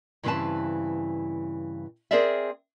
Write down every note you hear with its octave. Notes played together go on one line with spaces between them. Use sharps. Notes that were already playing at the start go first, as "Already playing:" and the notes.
G2 C#3 E3 C4 B4 A5
C4 G#4 A#4 C5 D5 E5